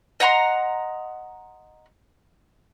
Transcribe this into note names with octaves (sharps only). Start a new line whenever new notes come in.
D#5 F#5 A#5 C6